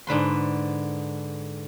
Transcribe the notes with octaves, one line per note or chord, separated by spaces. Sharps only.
G#2 D3 B4 C6